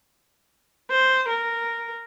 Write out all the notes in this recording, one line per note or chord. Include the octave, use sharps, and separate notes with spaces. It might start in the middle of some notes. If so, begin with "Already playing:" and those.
C5
A#4